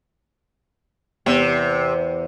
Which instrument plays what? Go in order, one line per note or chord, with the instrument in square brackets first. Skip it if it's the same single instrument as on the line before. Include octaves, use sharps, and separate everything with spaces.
[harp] E2 [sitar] C3